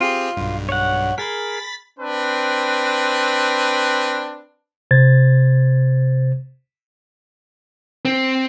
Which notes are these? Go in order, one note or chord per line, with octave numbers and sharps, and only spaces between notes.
C4 F4 G4 G#4
B1 G2
C#5 F#5
G#4 A#4 B5 A6 B6
C4 D4 B4
C3 C5 G#6 A6
C4